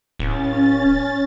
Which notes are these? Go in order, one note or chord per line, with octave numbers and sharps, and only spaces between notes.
D1 C#4 A6